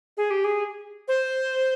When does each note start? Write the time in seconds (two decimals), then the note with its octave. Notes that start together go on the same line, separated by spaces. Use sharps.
0.17 G#4
0.31 G4
0.44 G#4
1.08 C5